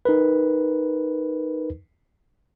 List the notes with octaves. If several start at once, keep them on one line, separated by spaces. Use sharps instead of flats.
D#4 A#4 B4